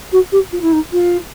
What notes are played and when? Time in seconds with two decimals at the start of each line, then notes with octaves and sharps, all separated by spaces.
0.12 F#4
0.32 G4
0.52 F4
0.62 E4
0.72 D#4
0.93 F4